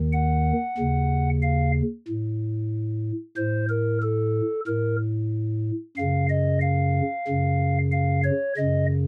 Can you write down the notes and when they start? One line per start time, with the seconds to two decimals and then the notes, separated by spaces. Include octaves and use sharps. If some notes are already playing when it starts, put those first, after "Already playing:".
Already playing: D#2 D#3
0.12 F#5
0.77 D#2 C#3
1.42 F5
2.08 A2
3.37 A2 C5
3.69 A#4
4.02 A4
4.67 A2 A#4
5.97 F#2 C#3 F5
6.29 D#5
6.61 F5
7.27 F#2 C#3
7.92 F5
8.24 C#5
8.57 F#2 C#3 D#5